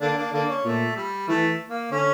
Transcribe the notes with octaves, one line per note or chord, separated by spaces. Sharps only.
D3 A#3 D4
A#3 D4
D3 A#3 D4
C#4
A#2 A3
G3
E3 A3
A#3
D3 C#4